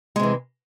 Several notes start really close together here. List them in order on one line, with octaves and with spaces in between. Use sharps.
G#3 C3 E3